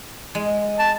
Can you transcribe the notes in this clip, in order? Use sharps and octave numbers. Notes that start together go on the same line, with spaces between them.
G#3
A5